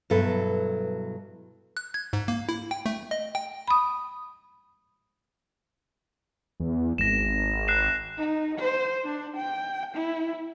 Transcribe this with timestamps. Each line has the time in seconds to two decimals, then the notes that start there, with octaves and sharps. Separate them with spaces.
0.10 G2 B2 F#3 E4 A4 B4
1.77 F#6
1.94 G#6
2.13 G#2
2.28 A#3
2.49 E4
2.71 G5
2.86 A3
3.11 D#5
3.35 G5
3.68 B5 D#6
6.60 E2
6.98 G#1 A#6 E7
7.68 F#6 C7 E7
8.18 D#4
8.58 C5
9.05 D4
9.37 G5
9.94 E4